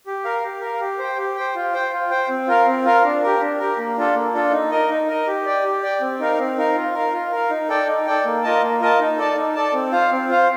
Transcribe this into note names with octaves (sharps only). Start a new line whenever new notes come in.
G4
A#4 F5
G4
A#4 F5
G4
C5 G5
G4
C5 G5
F4
C5 G5
F4
C5 G5
C4
F4 A#4 F5
C4
F4 A#4 F5
D4
G4 A#4
D4
G4 A#4
A#3
D4 F4 A4
A#3
D4 F4 A4
D#4
A#4 D#5
D#4
A#4 D#5
G4
D5 G5
G4
D5 G5
C4
D#4 A#4 F5
C4
D#4 A#4 F5
F4
A#4 F5
F4
A#4 F5
D#4
A4 D5 G5
D#4
A4 D5 G5
A#3
F4 A#4 D#5 A5
A#3
F4 A#4 D#5 A5
D#4
A4 D5 A5
D#4
A4 D5 A5
C4
F4 C5 F5
C4
F4 C5 F5